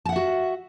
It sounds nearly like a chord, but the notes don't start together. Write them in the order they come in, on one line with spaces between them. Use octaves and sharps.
A5 F#5 E5 F#4